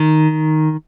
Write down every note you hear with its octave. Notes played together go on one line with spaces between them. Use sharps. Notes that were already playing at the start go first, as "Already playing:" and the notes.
Already playing: D#3